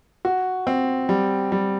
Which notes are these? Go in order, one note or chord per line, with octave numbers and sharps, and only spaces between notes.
F#4
C4
G3
G3